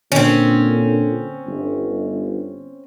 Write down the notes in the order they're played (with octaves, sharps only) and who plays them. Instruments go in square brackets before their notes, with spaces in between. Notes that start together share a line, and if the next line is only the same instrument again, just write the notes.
[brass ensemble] A#2 D3 [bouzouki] C4 C#4
[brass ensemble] G1